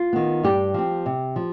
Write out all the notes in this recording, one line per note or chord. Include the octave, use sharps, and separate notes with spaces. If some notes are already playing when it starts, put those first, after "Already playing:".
Already playing: F4
D#3 B3
G2 G4
F3 C4
C3
F3